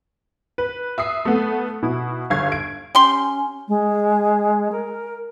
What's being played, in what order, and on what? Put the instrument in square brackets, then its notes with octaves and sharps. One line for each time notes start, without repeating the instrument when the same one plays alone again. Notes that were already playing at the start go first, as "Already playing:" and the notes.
[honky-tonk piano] B4
E5 D#6 C7
A3 B3
B2 E4
G1 F5 C#6 G#6 C7
D7
[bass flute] C#4 [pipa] G4 C6
[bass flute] G#3
A#4